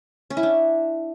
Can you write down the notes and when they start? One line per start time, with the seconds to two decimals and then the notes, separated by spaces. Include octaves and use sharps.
0.30 C#4
0.37 E4
0.43 D4